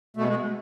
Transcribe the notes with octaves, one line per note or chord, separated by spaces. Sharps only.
B2 G#3 A3
G#3